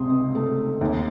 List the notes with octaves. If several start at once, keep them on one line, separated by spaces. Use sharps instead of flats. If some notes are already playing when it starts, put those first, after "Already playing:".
Already playing: C#2 C3 C6 D#6
A3
D#2